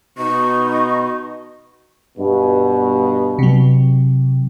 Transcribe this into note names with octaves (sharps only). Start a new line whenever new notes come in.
B2 D#4 C#6
G2 B2
C3 F#3